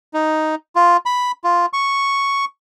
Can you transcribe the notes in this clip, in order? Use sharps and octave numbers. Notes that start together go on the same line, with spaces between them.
D#4
F4
B5
F4
C#6